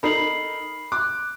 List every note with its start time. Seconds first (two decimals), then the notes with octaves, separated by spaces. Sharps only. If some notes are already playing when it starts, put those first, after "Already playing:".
0.03 D#4 A4 A#4 B5 C7 F#7
0.92 D6 F#6